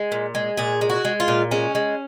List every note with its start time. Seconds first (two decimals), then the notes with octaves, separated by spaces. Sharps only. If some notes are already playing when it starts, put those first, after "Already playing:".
Already playing: G#3
0.12 A#2
0.35 G#3
0.57 A#2 G#4
0.81 G#3
0.90 F#4
1.05 G#3
1.20 F4
1.28 A#2
1.51 G#3 C#4
1.75 G#3